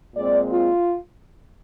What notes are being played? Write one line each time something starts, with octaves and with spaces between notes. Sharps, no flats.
A#2 G#3 C4 D5
F4